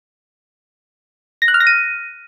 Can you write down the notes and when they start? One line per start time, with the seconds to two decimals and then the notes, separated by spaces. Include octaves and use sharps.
1.42 A#6
1.48 F#6
1.54 F6
1.60 A#6
1.67 D#7